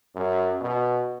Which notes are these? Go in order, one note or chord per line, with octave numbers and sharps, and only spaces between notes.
F#2
B2